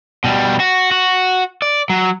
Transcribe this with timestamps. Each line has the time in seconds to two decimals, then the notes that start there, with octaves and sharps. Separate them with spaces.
0.24 B2 G3
0.60 F#4
0.91 F#4
1.62 D5
1.90 F#3